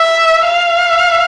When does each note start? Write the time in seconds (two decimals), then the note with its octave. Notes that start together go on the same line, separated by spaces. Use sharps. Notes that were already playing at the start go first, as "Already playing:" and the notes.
Already playing: E5
0.46 F5